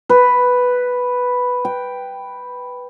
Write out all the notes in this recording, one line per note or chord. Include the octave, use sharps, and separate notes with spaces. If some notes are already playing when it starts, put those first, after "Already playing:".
B4
G5